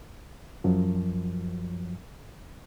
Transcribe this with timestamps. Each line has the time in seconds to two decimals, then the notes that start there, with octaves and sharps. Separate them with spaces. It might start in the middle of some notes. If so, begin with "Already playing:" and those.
0.64 F#2 F3 F#3